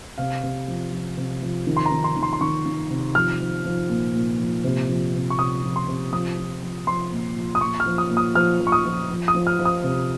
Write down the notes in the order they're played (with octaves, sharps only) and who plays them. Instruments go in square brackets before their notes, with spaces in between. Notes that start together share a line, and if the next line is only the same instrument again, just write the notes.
[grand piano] C3 F5
C3
F3
F3
C3
F3
D#3
C6
A#5
D#3
C6
D#3
C6
C6
D#3 C#6
D#3
C3
F3 F6
F3
F3
A#2
A#2
F3
C3
F3
C3
C#6
C3 D#6
F3
C6
C3
F3 D#6
F3
F3
F3 C6
A#2
F3
D#6
A#2 C#6
F6
F3
D#6
A#2
D#6
F3 F6
F3
C#6
D#6
F3
F3
D#6
F3
F6
F3
D#6
C3